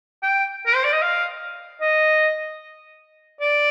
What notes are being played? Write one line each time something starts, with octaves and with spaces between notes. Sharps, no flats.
G5
A#4
C5
D5
D#5
F5
D#5
D5